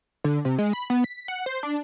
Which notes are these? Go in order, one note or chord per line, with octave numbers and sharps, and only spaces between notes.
D3
C3
G#3
B5
B3
B6
F#5
C5
D4